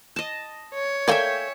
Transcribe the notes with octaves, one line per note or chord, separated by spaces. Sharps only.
D#5 A5
C#5
A3 A#3 D5 E5 G5 G#5